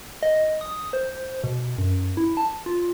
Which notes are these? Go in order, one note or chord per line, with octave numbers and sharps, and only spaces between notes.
D#5
D#6
C5
B2
F#2
E4
A5
F4